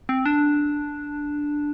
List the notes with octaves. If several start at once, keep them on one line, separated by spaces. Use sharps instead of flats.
C4
D4